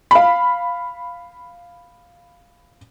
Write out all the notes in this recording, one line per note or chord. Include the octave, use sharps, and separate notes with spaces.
F5 B5